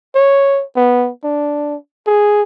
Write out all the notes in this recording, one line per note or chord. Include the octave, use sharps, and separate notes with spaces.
C#5
B3
D4
G#4